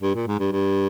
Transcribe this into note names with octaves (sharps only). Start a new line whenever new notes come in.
G2
A#2
G#2
G2
G2